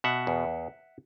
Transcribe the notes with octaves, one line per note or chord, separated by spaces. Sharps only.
B2 E5 F#5
E2